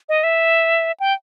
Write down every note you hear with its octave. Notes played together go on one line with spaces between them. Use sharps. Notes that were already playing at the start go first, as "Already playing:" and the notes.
D#5
E5
G5